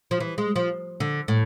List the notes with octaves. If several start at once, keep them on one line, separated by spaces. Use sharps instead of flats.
F3
E3
G#3
F3
D3
A2